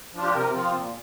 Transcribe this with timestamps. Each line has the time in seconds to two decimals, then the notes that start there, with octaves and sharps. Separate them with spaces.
0.13 F3 D4 F4
0.22 G4
0.34 C3 A#4
0.54 F3 C4 F4
0.75 A#2